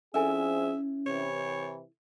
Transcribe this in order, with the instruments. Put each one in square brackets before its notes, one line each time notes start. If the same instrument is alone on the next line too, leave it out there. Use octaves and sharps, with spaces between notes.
[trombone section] F3 C4 G#4 [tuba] C#4 [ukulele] E4 A4 G#5 [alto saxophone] E5
[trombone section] C3 E3 [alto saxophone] C#5